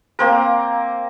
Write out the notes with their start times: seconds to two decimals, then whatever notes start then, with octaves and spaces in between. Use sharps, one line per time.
0.19 A#3 C4 A#4